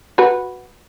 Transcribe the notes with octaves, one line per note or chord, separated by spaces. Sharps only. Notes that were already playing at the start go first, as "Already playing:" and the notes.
F#4 B4